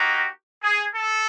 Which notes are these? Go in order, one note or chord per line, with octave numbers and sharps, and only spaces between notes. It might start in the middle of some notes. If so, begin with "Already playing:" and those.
Already playing: A#3 D#4 F#4 G4
G#4
A4